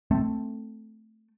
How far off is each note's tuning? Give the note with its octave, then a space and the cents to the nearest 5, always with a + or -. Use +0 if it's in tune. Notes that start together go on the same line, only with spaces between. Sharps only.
A3 +0 C4 +0